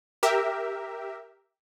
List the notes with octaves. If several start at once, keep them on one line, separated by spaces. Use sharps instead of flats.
G4 A#4 E5